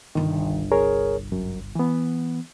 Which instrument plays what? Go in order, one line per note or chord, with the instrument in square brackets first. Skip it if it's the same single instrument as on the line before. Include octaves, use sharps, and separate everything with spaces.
[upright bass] G1 C2 [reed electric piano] D#3
[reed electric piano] G#4 A#4 C#5
F#2
E3 B3